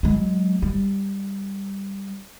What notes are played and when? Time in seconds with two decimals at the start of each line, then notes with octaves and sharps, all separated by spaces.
0.03 F#3 G#3
0.62 G3